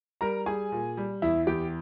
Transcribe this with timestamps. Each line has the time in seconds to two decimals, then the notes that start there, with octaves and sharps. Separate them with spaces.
0.21 G3 A#4 A#5
0.46 G3 G#4 G#5
0.72 A#2
0.97 G3
1.22 E2 E4 E5
1.47 E2 G4 G5